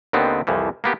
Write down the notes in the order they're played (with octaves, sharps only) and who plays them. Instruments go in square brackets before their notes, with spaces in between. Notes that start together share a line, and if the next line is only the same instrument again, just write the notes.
[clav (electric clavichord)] D#2 D3 D#3 B3 C4
C2 F2 E3 F3
A#3 B3 G4